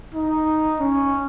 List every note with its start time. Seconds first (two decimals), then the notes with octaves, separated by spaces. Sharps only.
0.15 D#4
0.80 C#4